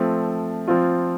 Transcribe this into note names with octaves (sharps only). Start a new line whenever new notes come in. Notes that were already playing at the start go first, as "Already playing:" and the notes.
Already playing: F3 A3 C4
F3 C4 F4